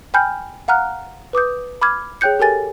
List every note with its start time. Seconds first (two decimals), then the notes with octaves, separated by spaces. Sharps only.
0.14 G5 G#5 B5 F6 G6
0.68 F5 F#5 A#5 F6 F#6
1.33 B4 D6 D#6 G6
1.82 B5 D6 F6 G#6
2.21 G#4 C#5 G5 F#6 G6 C#7
2.39 G4 A4 A#4 G#5 A6